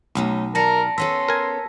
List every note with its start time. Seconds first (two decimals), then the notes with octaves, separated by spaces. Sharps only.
0.15 B1 A3 C#4 D#4
0.55 A#4 D5 A5 A#5 A#6 C#7
0.98 B3 C#4 A4 C6 E6 A#6 B6
1.28 A#4 G#5